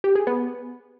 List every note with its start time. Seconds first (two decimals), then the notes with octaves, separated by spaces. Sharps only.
0.04 G4
0.15 G#4
0.27 B3